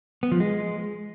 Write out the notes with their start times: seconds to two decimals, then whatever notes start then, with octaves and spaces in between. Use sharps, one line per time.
0.23 B3
0.32 F3
0.40 G#3